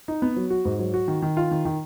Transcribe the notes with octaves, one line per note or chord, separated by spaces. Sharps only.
D#4
B3
F#3
F#4
G#2
F#3
F#4
D#3
D#3
F4
D#3
D#3